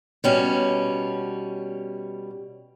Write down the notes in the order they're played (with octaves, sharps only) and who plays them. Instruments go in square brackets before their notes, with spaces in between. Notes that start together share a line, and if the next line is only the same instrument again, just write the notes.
[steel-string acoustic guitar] B2 G3 C#4